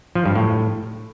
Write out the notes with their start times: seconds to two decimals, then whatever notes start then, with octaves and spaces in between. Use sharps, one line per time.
0.15 F3
0.25 G2
0.36 A2